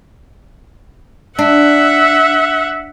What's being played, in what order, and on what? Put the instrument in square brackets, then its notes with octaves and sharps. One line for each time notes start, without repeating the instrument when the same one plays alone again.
[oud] D4 [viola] E5 F#5